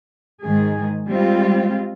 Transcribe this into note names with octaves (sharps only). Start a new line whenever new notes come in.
G#2 D#3 G#4
G3 G#3 C4 F4